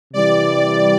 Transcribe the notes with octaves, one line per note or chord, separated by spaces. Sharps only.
C3 E3 G3 D5